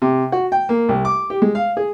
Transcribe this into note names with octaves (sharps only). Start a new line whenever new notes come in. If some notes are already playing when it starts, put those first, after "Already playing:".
C3
F#4
G5
A#3
C2
D6
G4
G#3
F5
G#4